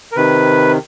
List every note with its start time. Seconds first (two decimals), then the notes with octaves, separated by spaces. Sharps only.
0.12 A#4
0.16 C3 D#3 B4